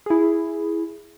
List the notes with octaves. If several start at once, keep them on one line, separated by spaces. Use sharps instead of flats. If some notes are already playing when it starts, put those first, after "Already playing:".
E4 G#4